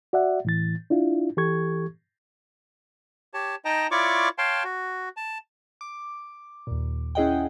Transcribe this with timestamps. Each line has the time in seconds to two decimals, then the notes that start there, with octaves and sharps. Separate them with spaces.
0.13 F#4 D5 E5 F#5
0.45 A2 E3 A6
0.90 D4 E4 F4
1.37 E3 G4 A4 C#6 G#6
3.34 G4 C#5 A5
3.65 D#4 D#5 G5 A5 A#5
3.91 E4 F4 C#5 D5 C#6 D6
4.38 C#5 F5 G5 A5 C6
4.64 F#4
5.17 A5
5.81 D6
6.67 D#2 A#2
7.15 C#4 E4 G#4 D#5 F#5 G5